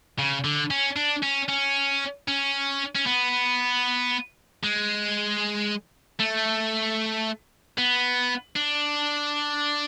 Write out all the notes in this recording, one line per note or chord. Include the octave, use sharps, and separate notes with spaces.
C#3
D3
C#4
D4
C#4
C#4
C#4
C#4
B3
G#3
A3
B3
D4